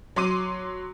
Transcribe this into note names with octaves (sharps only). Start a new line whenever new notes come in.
F#3 C6 D6 D#7